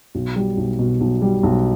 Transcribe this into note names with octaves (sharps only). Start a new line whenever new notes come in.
B1
G3
B1
B2
B1
G3
B1